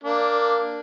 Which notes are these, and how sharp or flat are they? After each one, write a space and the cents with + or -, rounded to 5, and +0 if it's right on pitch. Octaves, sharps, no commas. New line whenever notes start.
A#3 +0 D4 +0